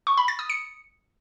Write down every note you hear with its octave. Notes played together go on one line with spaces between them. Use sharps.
C#6
B5
A6
D#6
C#7